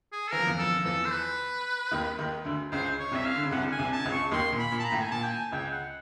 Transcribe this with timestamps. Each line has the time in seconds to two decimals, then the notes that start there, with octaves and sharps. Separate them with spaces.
0.12 G#4
0.28 A4
0.32 E3 A#4
0.40 F3
0.47 E2 E3
0.59 F2 F3 A4
0.79 F3
0.85 E2 E3 A4
1.05 C5
1.12 B4
1.91 D#2 D#3
2.19 D#2 D#3
2.45 D2 D3
2.71 C#2 C#3 C5
2.99 C#5
3.12 C2 C3 E5
3.25 F5
3.36 D3
3.44 C#3
3.52 C2 C3 F#5
3.72 G#5
3.79 C2 C3
3.92 A5
3.99 C3
4.05 C#2 C#3
4.12 C#6
4.32 D#2 D#3 C6
4.52 A#2
4.59 B5
4.72 A#2
4.79 A5
4.85 A#5
4.92 A2
5.01 G#5
5.11 A#2 A5
5.23 G5
5.31 G#5
5.51 C#2 C#3 G5
5.71 F#5